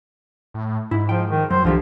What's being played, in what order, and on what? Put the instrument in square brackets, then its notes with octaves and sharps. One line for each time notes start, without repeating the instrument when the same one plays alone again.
[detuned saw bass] A2
[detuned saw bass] G#2 [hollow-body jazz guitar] E4
[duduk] F3 [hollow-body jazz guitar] G5
[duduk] D#3
[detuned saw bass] F#2 [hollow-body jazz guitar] F#3 [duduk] C5
[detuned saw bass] C2 [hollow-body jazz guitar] D3 E3 G4 [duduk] F3